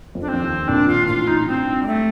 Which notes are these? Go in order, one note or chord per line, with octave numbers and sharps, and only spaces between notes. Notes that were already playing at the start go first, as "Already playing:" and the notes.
F2 F3
D4
F3 C4
D#2 D#3
A#1 A#2 D4
F4
A#2
A1 A2 F4
D#4
G2 C4
G3
A3